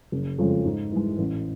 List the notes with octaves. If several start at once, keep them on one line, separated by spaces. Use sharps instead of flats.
F#1
F2 C#3 F3 G#3
G#2
E3 G#3
A1